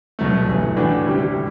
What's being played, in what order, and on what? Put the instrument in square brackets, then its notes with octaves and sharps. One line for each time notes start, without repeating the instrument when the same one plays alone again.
[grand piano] C2 B2 F#3 A3
G1 G2 E3 A3
A2 E3 A3 D4 F#4
D2 C3 G3 D4 G4
A2